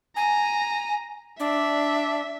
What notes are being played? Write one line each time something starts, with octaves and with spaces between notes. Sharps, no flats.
G#5 A#5
D4 E5